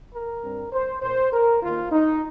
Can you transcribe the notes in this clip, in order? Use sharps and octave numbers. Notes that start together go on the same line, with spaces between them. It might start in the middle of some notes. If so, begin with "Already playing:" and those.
A#4
G2 G3 C4
C5
A#2 A#3 C5
A#4
D#2 D#3 A#3 F4
D#4